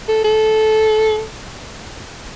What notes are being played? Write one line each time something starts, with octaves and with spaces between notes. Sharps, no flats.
A4
A4